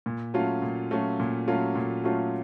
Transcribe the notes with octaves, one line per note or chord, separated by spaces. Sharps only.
A#2
F#3 A3 C#4 F4
A#2
F#3 A3 C#4 F4
A#2
F#3 A3 C#4 F4
A#2
F#3 A3 C#4 F4